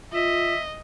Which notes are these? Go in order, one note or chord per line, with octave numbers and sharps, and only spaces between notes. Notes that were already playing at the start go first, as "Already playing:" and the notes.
F4 D#5 E5